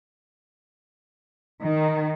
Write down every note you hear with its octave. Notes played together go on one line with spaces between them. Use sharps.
D#3